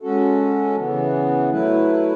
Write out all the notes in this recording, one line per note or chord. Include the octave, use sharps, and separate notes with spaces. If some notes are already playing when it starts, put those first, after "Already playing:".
G#3 C#4 F#4 A4
C#3 E3 B3
F#3 A3 E4 B4